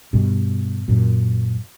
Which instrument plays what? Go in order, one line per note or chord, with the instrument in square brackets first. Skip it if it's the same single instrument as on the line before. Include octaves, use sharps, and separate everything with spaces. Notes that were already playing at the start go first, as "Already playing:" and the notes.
[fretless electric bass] G2 B2
F#2 A#2